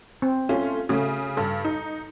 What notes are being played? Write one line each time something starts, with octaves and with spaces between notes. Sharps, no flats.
C4
A3 C#4 F4
C#3 A3 C#4 F#4
G2 A4
D#4